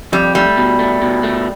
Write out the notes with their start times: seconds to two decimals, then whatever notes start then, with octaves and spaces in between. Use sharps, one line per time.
0.12 F2 G3
0.35 G3 A3
0.57 B2
0.79 A3
1.02 B2
1.23 A3